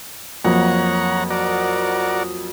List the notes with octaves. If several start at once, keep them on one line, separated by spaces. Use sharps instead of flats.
F2 F#3 A#3 C#5 F#5 A#5
F#4 A#4 D5